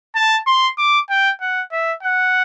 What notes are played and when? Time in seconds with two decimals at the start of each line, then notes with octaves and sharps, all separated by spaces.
0.15 A5
0.47 C6
0.78 D6
1.10 G5
1.41 F#5
1.72 E5
2.03 F#5